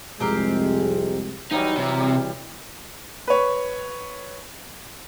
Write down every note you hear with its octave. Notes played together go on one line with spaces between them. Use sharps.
C2 F2 G#3 C4 G4 A#4
E3 F#3 G3 D#4
C3
G3
B4 C#5